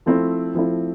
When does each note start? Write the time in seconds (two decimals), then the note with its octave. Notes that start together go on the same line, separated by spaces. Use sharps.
0.06 F3 A3 C4 E4
0.55 F3 A3 C4 E4